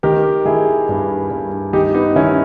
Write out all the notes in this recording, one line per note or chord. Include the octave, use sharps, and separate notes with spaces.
D#3 G4 A#4
D#3 E4 G#4
G2
G2
D#3 D#4 G4
B3 D#4
D#3 C#4 E4